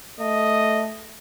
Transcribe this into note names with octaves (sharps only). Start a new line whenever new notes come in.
A3 D#5